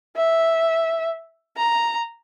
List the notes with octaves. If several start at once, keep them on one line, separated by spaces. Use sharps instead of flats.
E5
A#5